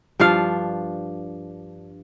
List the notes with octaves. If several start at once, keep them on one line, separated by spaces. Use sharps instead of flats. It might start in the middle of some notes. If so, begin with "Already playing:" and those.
G2 F3 D4 F5